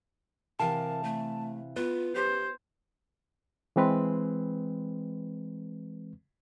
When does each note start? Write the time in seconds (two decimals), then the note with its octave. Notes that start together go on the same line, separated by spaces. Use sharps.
0.60 C3 E3 A#4 F5 A5
1.04 A3
1.76 B3 F4 B4
2.15 G4 C5
3.76 E3 G#3 C4 B4